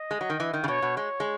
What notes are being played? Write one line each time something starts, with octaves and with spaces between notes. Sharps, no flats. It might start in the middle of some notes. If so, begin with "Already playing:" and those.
Already playing: D#5
G#3
F#3
D#3
E3
D#3
C#3
B2 C#5
B2
G#3 C#5
G#3